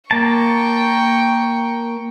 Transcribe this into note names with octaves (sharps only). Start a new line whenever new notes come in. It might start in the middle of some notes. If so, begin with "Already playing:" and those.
A#3 G5 A5 C#6